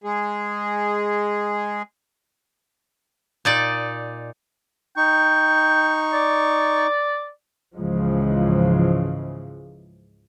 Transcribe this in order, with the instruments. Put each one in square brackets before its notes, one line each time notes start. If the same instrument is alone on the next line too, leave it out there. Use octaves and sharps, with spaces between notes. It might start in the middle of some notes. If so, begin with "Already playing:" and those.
[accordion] G#3 G#4
[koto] A#2 D#4 D5
[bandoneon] D#4 C#6 [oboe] G5
[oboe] D5
[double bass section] C#2 G#2 C#3 E3 F3 G#3